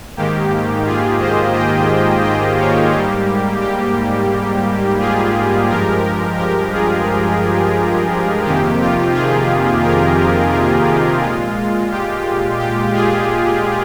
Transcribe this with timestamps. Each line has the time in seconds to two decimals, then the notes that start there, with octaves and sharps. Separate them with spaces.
0.17 G#2 D#3 A#3 G4
0.86 F4 G#4
1.20 C5 D#5
1.55 D#5 G5
2.24 D#5 G5
2.58 C#5 F5
2.93 G#2 G3 A#3 G4
3.62 G4
5.00 F4 G#4
5.69 G2 F3 G#3 G4 A#4
6.04 G4 A#4
6.38 G4 A#4
6.72 F4 G#4
8.45 F2 C3 D#3 A#3 G4
8.81 F4
9.14 F4 G#4
9.84 G4 A#4
10.18 G4
10.53 G4 A#4
10.87 G4
11.22 A#2 G#3 F4
11.91 G4
12.59 G4
12.94 F4 G#4